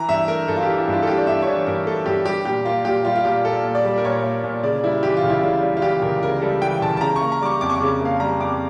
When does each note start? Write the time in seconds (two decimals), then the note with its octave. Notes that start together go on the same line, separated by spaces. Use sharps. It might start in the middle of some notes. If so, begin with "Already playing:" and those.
Already playing: E3 A#5
0.09 G2 E5
0.28 A3 A#4
0.48 G2 A4
0.57 F4
0.63 G4
0.68 E3
0.77 E4
0.88 G2 F4
1.03 A4
1.07 A3 G4
1.18 D5
1.26 G2 E5
1.42 C#5
1.47 E3 D5
1.66 G2 A#4
1.86 A3 A4
2.06 G2 G4
2.26 G3 G4
2.45 A#2 G4
2.65 A#3 F4
2.85 A#2 G4
3.05 G3 F4
3.16 F4
3.25 A#2 G4
3.45 A#3 A4
3.64 A#2
3.75 D5
3.85 G3
3.98 A#4
4.04 A#2 C#5
4.24 A#3
4.44 A#2
4.63 C#3 D5
4.84 G3 E4
5.03 E3 G4
5.17 F4
5.24 C#2
5.30 E4
5.42 C#3 F4
5.62 G3
5.77 F4
5.82 E3 G4
6.02 C#2 A#4
6.23 C#3 A#4
6.42 G3 A4
6.62 E3 G5
6.82 C#2 A5
6.97 A5
7.01 C#3 A#5
7.16 C#6
7.21 A#3
7.32 A#5
7.42 G3 D6
7.46 C#6
7.61 F2 D6
7.70 C#6
7.75 D6
7.81 C#3
8.01 A#3 F5
8.20 G3 A#5
8.40 F2 D6